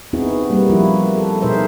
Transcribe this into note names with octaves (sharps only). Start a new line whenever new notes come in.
B3 C4 D#4 E4 F#4 G#4
G3 A#3 B4
F3 E4 F#4
A4
B2 D#4 G#4 A#4 C5 E5